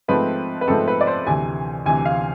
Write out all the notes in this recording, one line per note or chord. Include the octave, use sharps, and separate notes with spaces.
G#2 F3 A3 C4 B4
B4
G#2 F3 A3 C4 A4
B4
D5
C5
D2 C3 E3 G#5
D2 C3 E3 G#5
F5